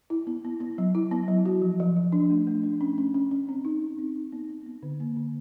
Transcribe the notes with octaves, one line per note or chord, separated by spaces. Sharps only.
E4
B3
B3
B3
F#3
E4
B3
F#3
F#4
F3
F3
F3
D4
A3
A3
D4
C#4
C#4
C#4
C#4
C4
D#4
D#4
C4
D#4
B3
B3
B3
D3
A#3
D3